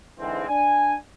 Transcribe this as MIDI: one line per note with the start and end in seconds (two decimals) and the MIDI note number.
0.20 0.47 44
0.20 0.47 50
0.20 0.47 52
0.20 0.47 56
0.20 0.47 60
0.49 0.94 62
0.49 0.94 80